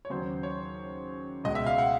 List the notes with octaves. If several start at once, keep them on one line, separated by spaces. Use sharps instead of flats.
C#5
D#2 C#3 F#3 C5
C#5
C#2 B2 G#3 D#5
E5
F5
F#5